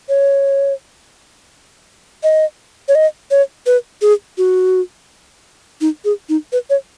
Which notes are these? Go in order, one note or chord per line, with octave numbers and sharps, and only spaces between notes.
C#5
D#5
C#5
D#5
C#5
B4
G#4
F#4
D#4
G#4
D#4
B4
C#5